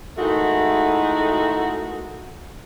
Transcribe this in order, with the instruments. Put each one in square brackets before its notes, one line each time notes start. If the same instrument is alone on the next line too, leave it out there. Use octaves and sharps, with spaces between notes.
[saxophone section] D#3 G#3 A3 D#4 E4 F#4